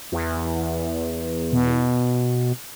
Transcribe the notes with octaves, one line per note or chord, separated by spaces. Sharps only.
E2
B2